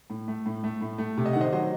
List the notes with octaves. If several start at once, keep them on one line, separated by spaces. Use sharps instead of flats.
A2
A3
A2
A3
A2
A3
C3
D#5
D#3 F#5
C5 D#5
F#3 C5 D#5